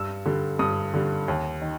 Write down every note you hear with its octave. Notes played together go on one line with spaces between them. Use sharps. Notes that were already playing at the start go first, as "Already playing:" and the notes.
Already playing: G2 E6
D3 G3
G2 D#6
D3 G3
D#2
D#3